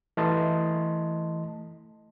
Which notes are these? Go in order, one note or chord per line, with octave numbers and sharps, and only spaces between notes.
E3 A3 D#5 A5 C6